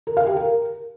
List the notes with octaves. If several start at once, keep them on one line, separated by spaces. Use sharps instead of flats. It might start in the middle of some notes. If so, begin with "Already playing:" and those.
A#4
F5
G4
A#4